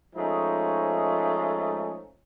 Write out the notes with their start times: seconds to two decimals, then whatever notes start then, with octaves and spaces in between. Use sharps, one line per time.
0.16 F3 G#3 A3 C#4 D#4